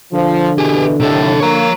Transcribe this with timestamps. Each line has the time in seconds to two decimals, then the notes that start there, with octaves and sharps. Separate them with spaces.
0.13 D3 F3
0.58 B2 E3 G4 G#4
1.00 D#2 A2 C3 A4
1.40 A#3 C#5 A#5